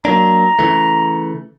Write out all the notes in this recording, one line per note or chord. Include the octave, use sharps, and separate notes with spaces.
F#3 A#3 D4 A#5
C#3 E3 A3